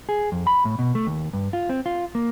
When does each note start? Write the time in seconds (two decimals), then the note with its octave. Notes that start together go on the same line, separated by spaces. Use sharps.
0.09 G#4
0.32 F2
0.47 B5
0.65 A2
0.79 B2
0.95 A3
1.07 D#2
1.33 G2
1.53 F4
1.69 C4
1.86 F4
2.15 A#3